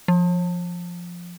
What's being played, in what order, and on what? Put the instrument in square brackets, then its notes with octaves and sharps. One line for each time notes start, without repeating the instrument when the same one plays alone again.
[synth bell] F3